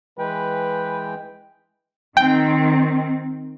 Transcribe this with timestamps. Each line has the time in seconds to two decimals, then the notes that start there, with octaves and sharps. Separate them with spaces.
0.19 E3 G#3 B4 G5
2.17 D#3 C4 G5